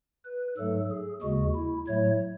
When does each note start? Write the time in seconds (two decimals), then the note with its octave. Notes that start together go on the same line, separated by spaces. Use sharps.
0.25 B4
0.57 G#2 F#3 A3 A4
0.90 G#4
1.22 D#2 C#3 G#3 F#4
1.55 E4
1.87 A2 F#3 A3 C#5